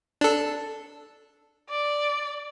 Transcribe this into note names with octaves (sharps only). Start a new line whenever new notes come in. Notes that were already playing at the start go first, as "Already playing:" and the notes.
D4 A4
D5